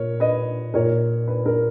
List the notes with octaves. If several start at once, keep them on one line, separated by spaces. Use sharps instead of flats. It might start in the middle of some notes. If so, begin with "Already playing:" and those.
Already playing: A#2 A#4 C#5
B4 D#5
A#2 A#4 C#5
B4
A#4